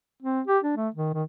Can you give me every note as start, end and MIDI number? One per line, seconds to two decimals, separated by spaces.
0.22 0.41 60
0.47 0.58 67
0.64 0.76 62
0.76 0.89 57
0.94 1.14 51
1.14 1.23 51